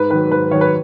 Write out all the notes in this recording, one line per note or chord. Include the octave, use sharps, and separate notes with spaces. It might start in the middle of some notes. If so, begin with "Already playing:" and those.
Already playing: G#2 B4
D#3 F#3 B4
G#2 B4
D#3 F#3 C#5
B4